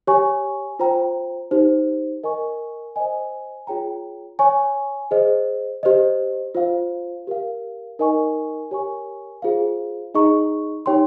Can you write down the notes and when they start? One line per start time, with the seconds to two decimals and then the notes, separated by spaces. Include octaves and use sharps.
0.07 G4 C#5 G#5 C#6
0.79 F4 C5 G5 A#5
1.51 D#4 G4 C5
2.24 A#4 D#5 G#5 C#6
2.96 C5 D#5 G#5
3.67 F4 G#4 C#5 G5 A#5
4.39 C#5 G#5 C#6
5.11 G#4 C5 D#5
5.83 G4 C5 D#5
6.55 F4 C5 F5
7.27 G4 A#4 F5
7.99 D#4 A#4 D#5 G#5 C#6
8.71 G4 A#4 C#5 G#5 C#6
9.42 F4 G#4 C5 F5
10.14 D#4 G#4 D#5 A#5 C#6
10.86 D#4 G4 C#5 G5 C6